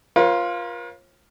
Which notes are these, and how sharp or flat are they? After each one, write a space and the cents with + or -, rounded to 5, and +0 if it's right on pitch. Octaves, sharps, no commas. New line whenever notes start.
F4 +0 A#4 +45 C#5 -40